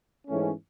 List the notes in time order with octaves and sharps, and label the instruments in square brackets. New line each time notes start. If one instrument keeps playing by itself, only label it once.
[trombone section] G#2 E3 A3 C#4